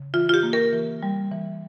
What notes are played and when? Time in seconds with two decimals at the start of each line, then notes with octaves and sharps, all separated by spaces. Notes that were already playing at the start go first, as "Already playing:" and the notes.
Already playing: C#3
0.14 E3 F4
0.29 F4
0.34 G4
0.43 A#3
0.53 A#4
0.73 E3
1.03 G3
1.32 E3